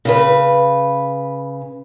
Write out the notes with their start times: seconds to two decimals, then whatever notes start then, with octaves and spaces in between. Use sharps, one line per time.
0.05 C#3 B4